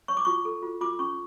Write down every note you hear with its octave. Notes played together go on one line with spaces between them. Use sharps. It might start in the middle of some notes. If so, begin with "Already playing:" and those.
C#5 C#6
D6
F4 C#6
A4
F4
F4 D6
C#4 C#6